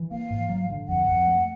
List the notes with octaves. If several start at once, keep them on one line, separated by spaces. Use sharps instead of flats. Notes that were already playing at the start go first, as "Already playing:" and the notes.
Already playing: E3
A#3 F5
G#2
F#3
D3
F2 F#5
F2
A3